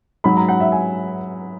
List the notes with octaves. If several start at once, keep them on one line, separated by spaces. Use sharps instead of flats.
G#2 F#3 B5
A#5
F#5
E5
G#5